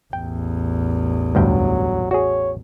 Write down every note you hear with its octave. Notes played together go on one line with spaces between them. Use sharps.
A1 E2 G5
D2 G2 F#3 G5
F#4 G#4 C#5